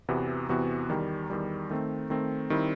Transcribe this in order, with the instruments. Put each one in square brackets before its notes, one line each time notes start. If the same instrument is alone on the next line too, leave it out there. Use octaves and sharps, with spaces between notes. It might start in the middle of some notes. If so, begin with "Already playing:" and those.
[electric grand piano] E2 C3 E3 B3 F#4
E2 C3 E3 B3 F#4
E2 D#3 G3
E2 D#3 G3
D#3 A3 C4
D#3 A3 C4
D#3 G3 C4 E4